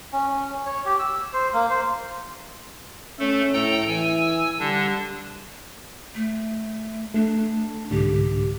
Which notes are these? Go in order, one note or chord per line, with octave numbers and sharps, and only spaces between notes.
C#4
C#4
C#5
G4
E6
C5
A#3
C5
A3 C#4 A4
A2 A4 G5 A#5
E3 G#5 E6
D3 G3 D4
A3
A3 D4
C2 G#2 D3 G4